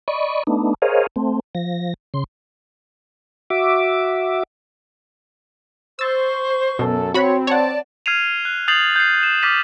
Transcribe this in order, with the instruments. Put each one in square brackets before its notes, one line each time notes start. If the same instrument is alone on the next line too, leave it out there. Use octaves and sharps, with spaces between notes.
[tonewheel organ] D5 D#5 B5 C#6
A3 B3 D4 D#4
G#4 A#4 C5 C#5 D#5 F5
A3 C4
F3 A#6
C#3 C6
F#4 E5 D6
[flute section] C5 C#6 [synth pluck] E6 A6
[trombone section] F#2 A4 [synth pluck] B2
[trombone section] C4 [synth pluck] F#4 B5 [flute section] C#5
[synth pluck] C#5 F#5 [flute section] D5 A5
[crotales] F6 G#6 C7 D#7 F7
F#6
D#6 G6 A6 C7 F7 F#7
G6 C7
E7
D6 F6 A6 B6 D#7